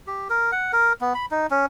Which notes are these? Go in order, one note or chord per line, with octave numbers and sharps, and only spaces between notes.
G4
A#4
F#5
A#4
B3
B5
D#4
C#4